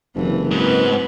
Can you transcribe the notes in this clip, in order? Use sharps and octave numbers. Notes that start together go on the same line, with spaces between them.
F#1 C3 E3
G#2 C4 F#4 B4